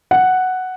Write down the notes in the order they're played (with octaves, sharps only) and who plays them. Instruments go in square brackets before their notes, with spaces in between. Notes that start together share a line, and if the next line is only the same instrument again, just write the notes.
[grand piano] F#5